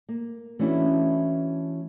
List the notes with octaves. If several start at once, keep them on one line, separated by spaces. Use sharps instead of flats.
A#3
E3 A3 C#4 D4 E4 F#4